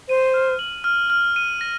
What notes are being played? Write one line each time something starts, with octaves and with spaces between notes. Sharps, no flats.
C5 D#7
F6
F#7
F6
F6
D#7
A#6